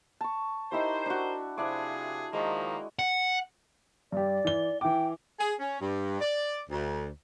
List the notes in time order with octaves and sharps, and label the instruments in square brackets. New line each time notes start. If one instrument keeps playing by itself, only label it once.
[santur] A5 C#6
[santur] D#4 E4 G4 [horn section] A#4 C5
[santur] D4 F#4
[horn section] C3 F3 G#4 [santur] D4 E4 D6
[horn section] D#3 F3 A#3 [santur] G#3
[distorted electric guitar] F#5
[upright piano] G2 G4 [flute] D5
[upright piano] E3 G7
[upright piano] E3 E4 D6 [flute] G5
[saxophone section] G#4
C#4
G2
D5
D2